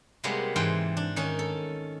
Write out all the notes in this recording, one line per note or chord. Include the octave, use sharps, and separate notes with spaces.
C3 G3 G#3 A#3 B3
G#2 E3 C5 G5
D4
D#3 C#4 D#4
A4